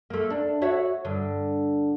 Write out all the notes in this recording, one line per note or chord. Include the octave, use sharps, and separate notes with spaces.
A3 A#3
D4
F#4 C#5 E5
G2 D3